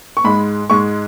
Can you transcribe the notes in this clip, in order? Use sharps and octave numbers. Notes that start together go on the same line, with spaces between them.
C#6
G#2 G#3 B5
G#2 G#3 C#6